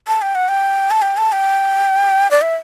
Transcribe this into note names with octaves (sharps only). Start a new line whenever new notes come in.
A5
G5
F#5
G5
A5
G5
A5
G5
D5
E5